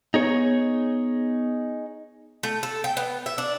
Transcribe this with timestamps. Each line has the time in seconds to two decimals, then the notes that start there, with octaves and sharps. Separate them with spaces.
0.14 B3 D#4 G#4 C#5
2.43 A3
2.63 A4
2.84 G5
2.97 B3
3.26 E5
3.38 D4